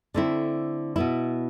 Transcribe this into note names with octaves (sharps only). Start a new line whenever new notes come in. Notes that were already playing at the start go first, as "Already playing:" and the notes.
D3 A3 C4 E4
B2 B3 E4